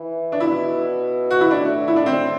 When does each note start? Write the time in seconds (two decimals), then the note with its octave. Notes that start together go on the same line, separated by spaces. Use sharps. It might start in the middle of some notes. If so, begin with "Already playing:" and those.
Already playing: E3
0.32 D4
0.40 B2 E4
1.30 F#4
1.41 E4
1.51 A2 D4
1.88 E4
1.96 D4
2.06 C4